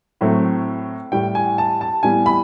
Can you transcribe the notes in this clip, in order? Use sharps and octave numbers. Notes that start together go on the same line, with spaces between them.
A2 F#3 A3 C4
A2 E3 G3 G5
G#5
A5
A5
A2 E3 G3 B3 G#5
B5